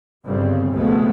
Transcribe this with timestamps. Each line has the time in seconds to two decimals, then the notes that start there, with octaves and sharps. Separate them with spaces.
0.26 G1 C#3 G3 C4
0.72 C#2 B2 F3 G#3 A3 B3